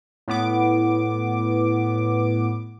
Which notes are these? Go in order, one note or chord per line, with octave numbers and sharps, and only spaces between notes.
A2 B3 D6